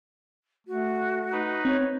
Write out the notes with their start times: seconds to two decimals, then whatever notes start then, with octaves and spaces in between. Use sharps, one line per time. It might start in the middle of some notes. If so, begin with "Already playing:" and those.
0.67 A3 F#4
1.32 D#4 B4
1.65 C4 C#5